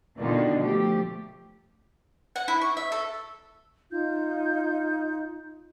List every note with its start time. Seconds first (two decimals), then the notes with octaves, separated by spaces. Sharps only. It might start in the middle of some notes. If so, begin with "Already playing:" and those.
0.19 B2 D3 D#3 D4 D#4 F4
0.58 F3 A3 G4
2.36 F#5
2.48 E4
2.61 C#6
2.77 E5
2.92 A4
3.91 D#4 F4 G6